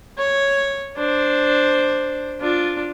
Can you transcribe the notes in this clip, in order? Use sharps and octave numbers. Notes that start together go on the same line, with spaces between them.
C#5
D4 C5
D4 F4